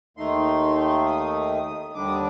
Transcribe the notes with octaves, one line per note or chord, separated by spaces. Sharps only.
D#2 D#3 A3 D#4 C6
D#6
D#2 D3 G3 D4 D6
D#6